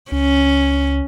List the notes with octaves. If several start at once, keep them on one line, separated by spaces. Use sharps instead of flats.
C#2 C#4